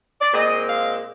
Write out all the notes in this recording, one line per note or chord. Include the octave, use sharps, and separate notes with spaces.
D5
A#2 G#3 C4 D#5
F5